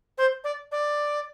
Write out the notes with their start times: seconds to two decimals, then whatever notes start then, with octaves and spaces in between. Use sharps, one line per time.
0.18 C5
0.44 D5
0.72 D5